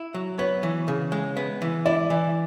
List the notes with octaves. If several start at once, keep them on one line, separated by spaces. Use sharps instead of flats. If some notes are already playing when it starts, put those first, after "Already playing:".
Already playing: E4
F#3
B3 C#5
E3
C#3
G#3
B3
E3
E4 D5
E3